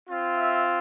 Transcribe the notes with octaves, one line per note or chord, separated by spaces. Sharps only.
C4 F4
E5